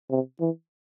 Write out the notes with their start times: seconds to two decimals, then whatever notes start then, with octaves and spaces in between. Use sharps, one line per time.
0.11 C3
0.40 E3